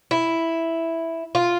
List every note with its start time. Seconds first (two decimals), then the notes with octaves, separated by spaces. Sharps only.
0.11 E4
1.35 F4